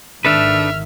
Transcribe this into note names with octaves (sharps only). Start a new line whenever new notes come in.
G#1 D#3 D4 A4 B4 E5 F6